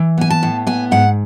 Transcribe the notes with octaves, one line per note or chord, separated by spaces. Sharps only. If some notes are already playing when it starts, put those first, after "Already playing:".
Already playing: E3
B3 G#5
A5
A2
B3 G#5
G#2 F#5